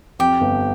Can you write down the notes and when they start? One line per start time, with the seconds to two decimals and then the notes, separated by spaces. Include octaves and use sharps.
0.19 F2 G4
0.41 G1